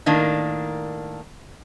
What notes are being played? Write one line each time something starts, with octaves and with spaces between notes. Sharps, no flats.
A2 D#3 A#3 D4